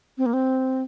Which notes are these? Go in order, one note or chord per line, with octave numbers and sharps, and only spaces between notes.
C4
A#3
C4